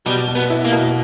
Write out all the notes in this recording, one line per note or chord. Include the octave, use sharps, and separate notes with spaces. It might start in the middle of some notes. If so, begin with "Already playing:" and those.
B2 G3
B2
B3
E4
A#3
B2